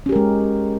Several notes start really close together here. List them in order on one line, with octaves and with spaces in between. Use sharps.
C#4 G4 A#4 G#3